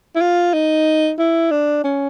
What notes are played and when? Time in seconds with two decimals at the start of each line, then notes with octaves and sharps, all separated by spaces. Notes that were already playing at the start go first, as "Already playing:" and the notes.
0.16 E4
0.21 F4
0.53 D#4
1.19 E4
1.51 D4
1.84 C#4